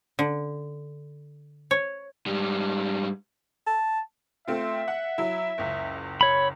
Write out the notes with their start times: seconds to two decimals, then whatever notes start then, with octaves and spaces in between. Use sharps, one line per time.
0.19 D3
1.71 C#5
2.27 G#2 G3
3.67 A5
4.48 A3 C4 F4 E5
4.88 F#5
5.18 F#3 E4
5.58 F#1 C#2
6.21 C#5 B5